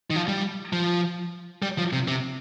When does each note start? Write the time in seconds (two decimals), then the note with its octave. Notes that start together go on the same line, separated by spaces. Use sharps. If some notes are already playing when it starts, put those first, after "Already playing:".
0.10 D#3
0.16 F3
0.28 G3
0.73 F3
1.62 G3
1.78 F3
1.93 C3
2.08 C3